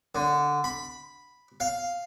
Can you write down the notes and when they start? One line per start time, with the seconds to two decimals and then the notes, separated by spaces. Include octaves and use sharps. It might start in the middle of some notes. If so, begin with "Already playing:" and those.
0.15 D3
0.64 B5
1.60 F5